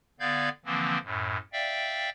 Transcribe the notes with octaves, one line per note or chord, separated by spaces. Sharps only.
D3 B3 D5 F5 G6 G#6
D3 E3 F3 A#3 C4
F#2 A2
D5 E5 F5 G5